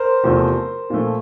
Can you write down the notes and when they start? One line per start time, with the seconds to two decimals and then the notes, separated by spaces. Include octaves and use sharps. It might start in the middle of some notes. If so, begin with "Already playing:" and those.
Already playing: A#4 C5
0.24 E2 C3 F3 A3
0.90 A#2 F3 A3